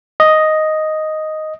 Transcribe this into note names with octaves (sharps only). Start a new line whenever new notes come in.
D#5